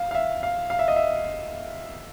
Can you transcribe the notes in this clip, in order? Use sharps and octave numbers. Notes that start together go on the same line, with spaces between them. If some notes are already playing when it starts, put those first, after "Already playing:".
Already playing: F5
F5
E5
F5
F5
E5
D#5
E5